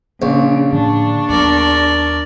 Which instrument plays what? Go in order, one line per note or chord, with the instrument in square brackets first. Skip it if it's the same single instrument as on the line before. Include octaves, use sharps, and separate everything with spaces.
[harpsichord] A#1 [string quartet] C#3
[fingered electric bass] A2 D3 F3 [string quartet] D4 C#6
[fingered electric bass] D#2 F#3 B3 [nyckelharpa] A#4 D5